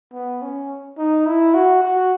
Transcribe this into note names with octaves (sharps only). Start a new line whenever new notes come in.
B3
C#4
D#4
E4
F#4
F#4